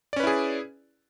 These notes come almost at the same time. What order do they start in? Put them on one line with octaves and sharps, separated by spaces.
D5 C#4 B4 E4 G#4